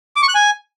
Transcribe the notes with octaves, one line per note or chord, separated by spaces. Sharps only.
D6
C#6
F#6
G#5